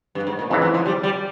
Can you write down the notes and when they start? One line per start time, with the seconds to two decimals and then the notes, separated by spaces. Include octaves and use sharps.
0.15 G2
0.27 G#2
0.39 A#2
0.50 F2 G#2 C#3 E3
0.62 G#2
0.74 F3
0.86 G3
1.03 G3